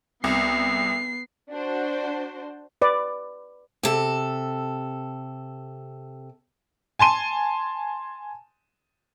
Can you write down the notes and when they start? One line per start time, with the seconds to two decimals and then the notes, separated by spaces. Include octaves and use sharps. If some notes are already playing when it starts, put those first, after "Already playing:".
0.24 C2 B3 C7
1.51 D4 F#4 C5
2.82 B4 D5
3.83 C3 A4
6.99 G#5 A5 C6 D#7